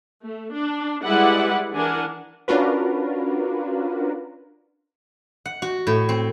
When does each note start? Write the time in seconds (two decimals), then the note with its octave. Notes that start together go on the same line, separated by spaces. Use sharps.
0.23 A3
0.53 D4
1.03 G3 G#3 E4 B4 D5 F#5
1.74 E3 D4 A#4 F#5 G#5
2.48 C#4 D4 F4 F#4 A#4 B4
5.46 F#5
5.62 F#4
5.87 A2
6.09 C4